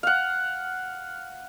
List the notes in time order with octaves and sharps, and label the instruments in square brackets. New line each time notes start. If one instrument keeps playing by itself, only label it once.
[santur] F5 F#5